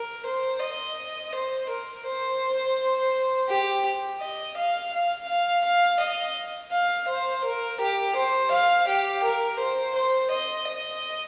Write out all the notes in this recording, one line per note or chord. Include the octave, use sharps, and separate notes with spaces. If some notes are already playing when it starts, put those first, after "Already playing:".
Already playing: A#4
C5
D#5
C5
A#4
C5
G4
D#5
F5
F5
F5
F5
D#5
F5
C5
A#4
G4
C5
F5
G4
A#4
C5
C5
D#5
D#5